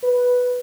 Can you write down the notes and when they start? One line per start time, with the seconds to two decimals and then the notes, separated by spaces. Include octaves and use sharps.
0.03 B4